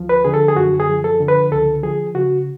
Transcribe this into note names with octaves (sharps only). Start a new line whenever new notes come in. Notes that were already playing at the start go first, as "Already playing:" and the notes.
Already playing: D2 F3
B4
D3 G#4
A4
G#4
F#2 F#4
G#4
F3
A4
D3
B4
C#2 A4
F3 G#4
C#3 F#4